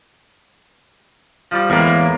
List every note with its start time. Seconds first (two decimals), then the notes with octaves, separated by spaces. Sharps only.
1.51 F3 G3 D6
1.70 E2 A2 G#3 A#3 B5